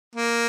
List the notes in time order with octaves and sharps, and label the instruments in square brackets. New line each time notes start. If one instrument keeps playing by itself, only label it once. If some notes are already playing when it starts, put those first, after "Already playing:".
[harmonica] A#3